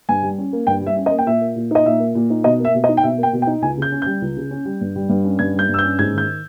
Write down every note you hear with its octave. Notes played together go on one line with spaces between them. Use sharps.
G2 G#5
G3
C#4
A#3
G2 G5
G3 E5
C#4
D#5
A#3
G5
A#2 E5
A#3
A#2
D#4 D#5
A#2 E5
A#3
A#2
D#4
B2 D#5
A#3
E5
B2
D#5
D#4
G5
B2 E5
A#3
G5
B2
G5
D#4
C#2 G#5
C#3 G6
C#4
G3 G6
C#2
C#3
C#4
G3
G2
G3
G2
C#4
G2 G#6
G3 G6
G2
E6
G6
C#4
G#2 G#6
D#3 G6